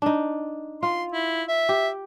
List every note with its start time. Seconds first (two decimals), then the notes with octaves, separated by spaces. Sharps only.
0.02 D4 D#4
0.83 F4 C6
1.12 E4
1.48 E5
1.69 G4